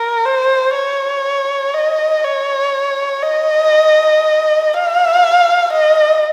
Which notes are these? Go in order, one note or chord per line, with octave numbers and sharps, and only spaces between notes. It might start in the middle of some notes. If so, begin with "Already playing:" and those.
Already playing: A#4
C5
C#5
D#5
C#5
D#5
F5
D#5